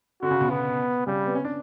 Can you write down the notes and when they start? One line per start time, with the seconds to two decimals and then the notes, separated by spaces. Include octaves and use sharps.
0.22 D3 F#4
0.31 C#3
0.41 B2
0.50 B3
1.07 C#3 G3
1.26 B3
1.35 C#4
1.45 D4